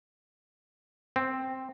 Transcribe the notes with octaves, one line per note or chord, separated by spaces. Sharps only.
C4